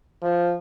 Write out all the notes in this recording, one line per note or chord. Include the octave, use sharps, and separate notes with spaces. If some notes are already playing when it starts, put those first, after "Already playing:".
F3